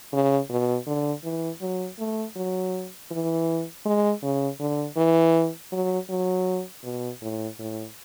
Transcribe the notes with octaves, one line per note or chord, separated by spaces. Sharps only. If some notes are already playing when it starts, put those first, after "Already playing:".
C#3
B2
D3
E3
F#3
A3
F#3
E3
G#3
C#3
D3
E3
F#3
F#3
B2
A2
A2